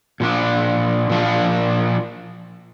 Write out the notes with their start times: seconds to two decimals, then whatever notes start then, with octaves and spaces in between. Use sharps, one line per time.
0.20 A#2 F3 D4
1.10 A#2 F3 D4